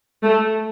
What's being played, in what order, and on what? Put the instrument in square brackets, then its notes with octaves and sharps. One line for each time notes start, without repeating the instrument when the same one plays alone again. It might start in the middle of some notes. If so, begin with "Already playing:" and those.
[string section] A3